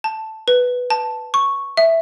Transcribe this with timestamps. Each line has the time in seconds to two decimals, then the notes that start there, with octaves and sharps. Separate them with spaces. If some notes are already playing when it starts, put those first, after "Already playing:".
0.04 A5
0.48 B4
0.90 A5
1.34 C#6
1.77 E5